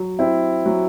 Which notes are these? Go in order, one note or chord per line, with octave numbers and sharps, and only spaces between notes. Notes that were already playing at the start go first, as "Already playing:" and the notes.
Already playing: F#3
C4 E4
F#3